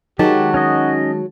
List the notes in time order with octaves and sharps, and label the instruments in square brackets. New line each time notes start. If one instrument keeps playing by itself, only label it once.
[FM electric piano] D#3 G#3 A5 [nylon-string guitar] F#3 [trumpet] F#4 [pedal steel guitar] G4
[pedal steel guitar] C#4 D#4 D#5